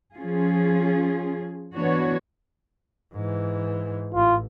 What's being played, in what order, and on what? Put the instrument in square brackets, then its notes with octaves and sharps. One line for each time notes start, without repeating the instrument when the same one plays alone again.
[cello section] F3 C#4 F4 G#4
E3 B3 D4 F#4 C#5
[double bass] G#2 E3
[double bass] A1 [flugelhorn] F4